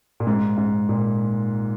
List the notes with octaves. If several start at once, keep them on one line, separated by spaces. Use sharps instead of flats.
A#2
G#2
G#2
A#2